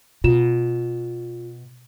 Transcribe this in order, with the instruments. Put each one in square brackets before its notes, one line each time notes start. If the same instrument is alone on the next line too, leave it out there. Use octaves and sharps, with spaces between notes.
[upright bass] B2 [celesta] F4 E7